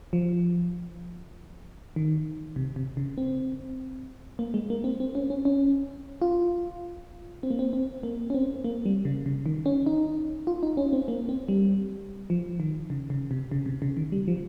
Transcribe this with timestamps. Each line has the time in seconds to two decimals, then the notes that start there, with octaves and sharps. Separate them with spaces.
0.13 F3
1.96 D#3
2.56 C3
2.76 C3
2.97 C#3
3.18 C4
4.39 A#3
4.54 G#3
4.70 A#3
4.84 C4
5.00 C4
5.15 C#4
5.30 C#4
5.45 C#4
6.22 F4
7.43 C4
7.51 A#3
7.59 C4
7.73 C4
8.03 A#3
8.30 C#4
8.34 C4
8.64 A#3
8.86 G3
9.05 C#3
9.26 C#3
9.46 D#3
9.66 C#4
9.86 D#4
10.47 F4
10.63 D#4
10.77 C#4
10.93 C4
11.08 A#3
11.29 C4
11.48 G3
12.30 F3
12.60 D#3
12.90 C#3
13.10 C#3
13.31 C3
13.51 C#3
13.66 C3
13.82 C#3
13.97 D#3
14.12 G3
14.28 F3